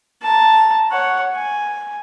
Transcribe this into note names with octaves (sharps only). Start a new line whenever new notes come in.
A5 A#5
C#5 F#5
G#5